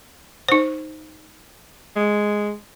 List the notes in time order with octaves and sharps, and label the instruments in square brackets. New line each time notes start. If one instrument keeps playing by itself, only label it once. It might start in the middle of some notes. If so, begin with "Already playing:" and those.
[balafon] D#4 C5
[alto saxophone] G#3